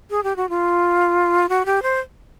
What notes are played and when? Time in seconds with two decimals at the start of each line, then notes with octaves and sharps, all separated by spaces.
0.10 G#4
0.23 G4
0.36 F#4
0.49 F4
1.49 F#4
1.65 G4
1.82 C5